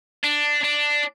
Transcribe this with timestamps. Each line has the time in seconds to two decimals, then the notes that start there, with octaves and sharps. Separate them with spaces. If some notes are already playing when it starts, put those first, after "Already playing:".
0.24 D4
0.64 D4